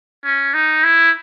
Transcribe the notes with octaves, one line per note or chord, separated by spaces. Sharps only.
C#4
D#4
E4